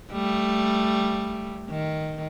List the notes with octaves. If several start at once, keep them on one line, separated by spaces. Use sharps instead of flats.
G3 A3
D#3